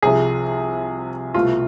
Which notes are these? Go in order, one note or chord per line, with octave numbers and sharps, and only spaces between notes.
C2 C3 F3 G#4
C2 B2 A3 F4